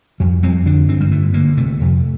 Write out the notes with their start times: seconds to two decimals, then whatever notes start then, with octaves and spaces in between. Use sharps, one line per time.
0.20 F2 G3
0.42 F2 C4
0.66 D3 D4
0.89 G2 C4
1.00 G3
1.11 D3 A3
1.34 D3 A#3
1.57 C3 A3
1.80 F2